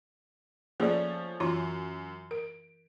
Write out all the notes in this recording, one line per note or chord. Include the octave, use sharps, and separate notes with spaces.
F3 A3 A#3 C#4 G#4 D5
F#2 E3 F4
A#4 D7